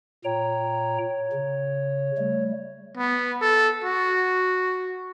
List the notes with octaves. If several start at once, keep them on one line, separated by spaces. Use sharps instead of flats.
A#2 C#5 G5 A#5
C#3
G3 A3
B3
A4
F#4